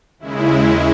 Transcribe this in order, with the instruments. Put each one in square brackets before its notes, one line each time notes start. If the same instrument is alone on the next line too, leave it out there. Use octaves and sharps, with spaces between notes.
[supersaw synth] D#2 C#3 G#3 E4